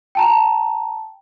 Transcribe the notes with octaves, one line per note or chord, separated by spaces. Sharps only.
G5 A5 A#5